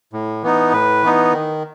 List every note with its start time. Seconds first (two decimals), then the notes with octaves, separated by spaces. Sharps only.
0.13 A2
0.43 E3 B3 D#4
0.73 A2 B4
1.03 E3 B3 D#4
1.33 D#3